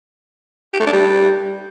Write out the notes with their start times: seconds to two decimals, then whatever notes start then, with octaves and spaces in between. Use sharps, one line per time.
0.73 G4
0.80 A3
0.86 D4
0.93 G3